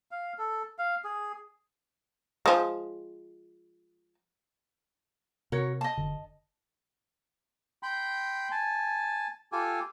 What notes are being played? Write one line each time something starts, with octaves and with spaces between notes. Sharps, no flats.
F5
A4
F5
G#4
F3 G#3
C3 F#4 A#4 C#5
D#5 A5
F#1 D3
G5 B5 C6
G#5 A5
F4 G4 A4 G#5